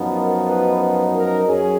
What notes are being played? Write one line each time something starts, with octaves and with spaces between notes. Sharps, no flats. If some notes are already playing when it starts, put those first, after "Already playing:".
Already playing: F#2 F3 B3 D#4
A#4
B4
B4
A#4
F#2 C#4 G#4